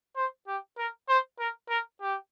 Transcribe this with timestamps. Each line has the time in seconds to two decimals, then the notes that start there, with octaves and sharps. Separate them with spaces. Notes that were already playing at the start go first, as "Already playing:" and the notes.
0.16 C5
0.47 G4
0.78 A#4
1.09 C5
1.40 A#4
1.69 A#4
2.01 G4